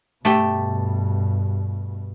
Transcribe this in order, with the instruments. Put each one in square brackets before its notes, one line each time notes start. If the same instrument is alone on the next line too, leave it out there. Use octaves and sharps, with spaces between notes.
[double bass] G2 B2 [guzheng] A3 G4 E5